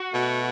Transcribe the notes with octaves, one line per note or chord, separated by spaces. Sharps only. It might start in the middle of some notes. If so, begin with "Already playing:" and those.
Already playing: F#4
B2 A3